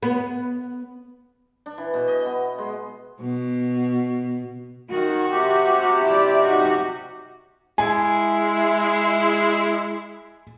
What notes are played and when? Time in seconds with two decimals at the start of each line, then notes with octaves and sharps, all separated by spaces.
0.03 B3
1.66 D4
1.78 E3
1.94 B2
2.08 D#5
2.26 B3
2.58 G#3
3.21 B2
4.90 D#3 F#4
5.30 C3 G4
6.05 E4 D5
6.44 D#4 F#4
7.78 G#3 E4 G#5